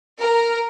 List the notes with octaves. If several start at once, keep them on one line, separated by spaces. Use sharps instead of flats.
A#4